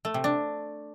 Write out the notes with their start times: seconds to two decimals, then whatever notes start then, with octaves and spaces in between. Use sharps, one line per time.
0.05 A3
0.14 C3
0.24 D4